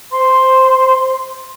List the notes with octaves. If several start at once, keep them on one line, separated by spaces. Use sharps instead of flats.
C5 C6